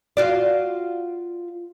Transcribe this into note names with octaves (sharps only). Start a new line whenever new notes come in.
F4 F#4 D5